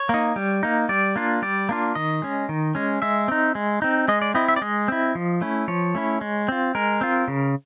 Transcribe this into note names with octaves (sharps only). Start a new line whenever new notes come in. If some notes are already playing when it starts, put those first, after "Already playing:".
Already playing: C#5
A#3 D#4
G3
A#3 D#4
G3 D5
A#3 D4 F4
G3 D5
A#3 D4 F4
D#3 D#5
G#3 C#4
D#3
G#3 C#4
G#3 E5
C4 D#4
G#3
C4 D#4
G#3 D#5
D5
C4 E4 D#5
E5
D5
G#3 D#5
C4 E4
F3
A3 C#4 E4
F3 C#5
A3 C#4 E4
G#3
C4 F4
G#3 A#4
C4 F4
C#3